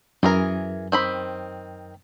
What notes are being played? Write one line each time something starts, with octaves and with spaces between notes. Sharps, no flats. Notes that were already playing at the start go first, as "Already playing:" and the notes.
F#2 E3 G#4 A#4
D#3 C4 B5